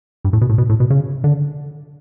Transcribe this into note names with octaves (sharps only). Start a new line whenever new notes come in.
G2
A2
B2
A2
B2
A2
B2
C#3
D3